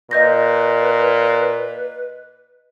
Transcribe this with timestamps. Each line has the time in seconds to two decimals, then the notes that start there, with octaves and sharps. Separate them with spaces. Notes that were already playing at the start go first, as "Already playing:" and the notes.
0.11 A#2 B4 D#5 G6 A#6